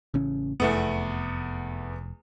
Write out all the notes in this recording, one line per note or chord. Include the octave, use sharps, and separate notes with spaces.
A1 C#3 C#4
F1 E2 A3 B3